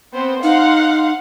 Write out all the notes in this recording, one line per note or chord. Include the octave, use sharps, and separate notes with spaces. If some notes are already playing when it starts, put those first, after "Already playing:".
B3 C4 C5
D#4 F5 F#5 C6